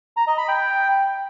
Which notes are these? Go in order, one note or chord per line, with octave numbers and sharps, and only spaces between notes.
A#5
D#5
B5
G5